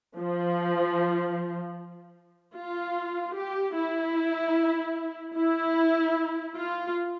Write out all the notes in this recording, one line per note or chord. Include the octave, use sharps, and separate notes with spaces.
F3
F4
G4
E4
E4
F4